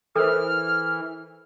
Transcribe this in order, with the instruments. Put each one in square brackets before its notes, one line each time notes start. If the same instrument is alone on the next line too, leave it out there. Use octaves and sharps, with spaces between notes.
[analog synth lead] E3 [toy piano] A4 A#4 C5 [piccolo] F6